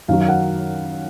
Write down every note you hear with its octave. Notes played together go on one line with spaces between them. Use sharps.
F#2 D#3 F#3 F5
F5
F#5